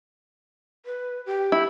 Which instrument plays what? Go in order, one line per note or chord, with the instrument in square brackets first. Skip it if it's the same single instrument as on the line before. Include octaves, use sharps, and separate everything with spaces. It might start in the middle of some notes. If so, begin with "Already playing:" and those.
[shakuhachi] B4
G4
[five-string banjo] E4